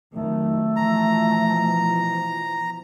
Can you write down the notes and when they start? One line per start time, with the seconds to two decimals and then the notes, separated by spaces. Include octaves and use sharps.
0.13 F2 D#3 F#3 A3
0.76 B2 E3 F3 A#5